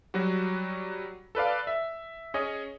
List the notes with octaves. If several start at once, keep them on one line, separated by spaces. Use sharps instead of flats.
F#3 G3 F#4
A4 B4 D5 F5
E5
C#4 G#4 C#5 D#5